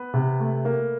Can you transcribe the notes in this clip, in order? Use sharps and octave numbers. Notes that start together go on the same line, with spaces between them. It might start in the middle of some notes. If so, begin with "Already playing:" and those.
Already playing: B3 B4
C3
A3
A#3